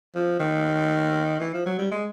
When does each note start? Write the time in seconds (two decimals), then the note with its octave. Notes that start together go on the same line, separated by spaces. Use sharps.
0.15 F3
0.40 D#3
1.40 E3
1.54 F3
1.66 F#3
1.78 G3
1.91 G#3